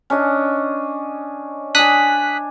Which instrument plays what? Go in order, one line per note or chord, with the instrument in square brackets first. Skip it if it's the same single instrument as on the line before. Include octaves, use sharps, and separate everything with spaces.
[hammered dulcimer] C#4 D4 D#5
[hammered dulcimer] D4 G#5 [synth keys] D#6 F#6 B6